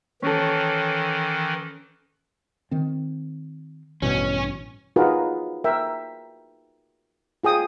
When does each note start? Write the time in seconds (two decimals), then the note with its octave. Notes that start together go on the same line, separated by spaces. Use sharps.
0.22 D#3 E3 C#4 A4
2.71 D#3 C4
4.02 A1 G2 B2 C#4
4.96 D#4 F4 F#4 G#4 A#4 B4
5.64 A#4 E5 G5
7.44 F4 G#4 G5 D#6